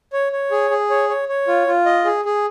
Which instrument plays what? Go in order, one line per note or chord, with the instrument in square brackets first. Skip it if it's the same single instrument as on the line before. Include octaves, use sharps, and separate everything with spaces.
[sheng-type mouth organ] C#5
C#5
G#4
G#4
C#5
C#5
C#5
F4
F4
D#5
G#4
G#4